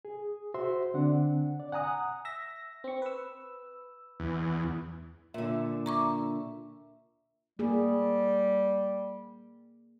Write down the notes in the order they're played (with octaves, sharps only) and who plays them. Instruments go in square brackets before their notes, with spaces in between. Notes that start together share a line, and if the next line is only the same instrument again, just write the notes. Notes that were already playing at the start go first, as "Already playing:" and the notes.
[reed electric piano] G#4
F#4 C5 E5 C6
D3 C4 D4 F#5
D5
F#5 G#5 A#5 D#6 F#6
[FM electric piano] E5 A#6
C4 C#6
B4 E6
[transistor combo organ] E2
[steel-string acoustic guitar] A#2 D3 [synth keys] E5
[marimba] A#5 C#6 D6
[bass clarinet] G3 [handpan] A#3 G#4